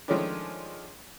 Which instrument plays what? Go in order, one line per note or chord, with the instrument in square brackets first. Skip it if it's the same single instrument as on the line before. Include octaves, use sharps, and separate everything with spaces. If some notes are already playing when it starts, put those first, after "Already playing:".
[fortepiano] D#3 F3 G#3 A3 C#4 D4